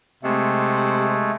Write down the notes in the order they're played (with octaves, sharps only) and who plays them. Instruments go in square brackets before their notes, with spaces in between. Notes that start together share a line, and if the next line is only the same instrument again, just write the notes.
[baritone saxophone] C3 [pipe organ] G#3 A3